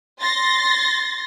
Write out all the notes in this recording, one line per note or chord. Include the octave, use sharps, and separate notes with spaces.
C6 A6 A#6